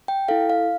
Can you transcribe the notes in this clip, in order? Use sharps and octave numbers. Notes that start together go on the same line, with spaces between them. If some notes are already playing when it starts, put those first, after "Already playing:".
G5
E4 A4 F5
F5